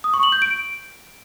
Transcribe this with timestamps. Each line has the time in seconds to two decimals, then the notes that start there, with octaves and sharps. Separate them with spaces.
0.04 D#6
0.14 C#6
0.23 F#7
0.32 G6
0.42 D7